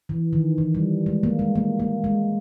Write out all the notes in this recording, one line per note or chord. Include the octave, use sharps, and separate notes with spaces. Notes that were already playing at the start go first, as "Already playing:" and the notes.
E3
D#3
E3
G3
G#3
A#3
G#3
A#3
A#3
G#3